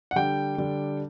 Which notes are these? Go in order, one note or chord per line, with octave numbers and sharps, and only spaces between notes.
F#5
D3 G3 D4 G5
D3 G3 D4